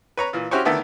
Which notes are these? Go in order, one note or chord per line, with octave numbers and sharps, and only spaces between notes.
B4 C#5 A#5
A#2 E3
C#4 E4 F#4 G4 C5 C#5
D3 D#3 A3 B3 D4 E4